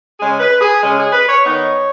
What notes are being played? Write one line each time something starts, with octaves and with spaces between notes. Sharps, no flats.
C#3 G#3 C#4 G#4
B4
G#4
C#3 G#3 C#4 G#4
G#4
B4
C#5
D#3 B3 D#4 C#5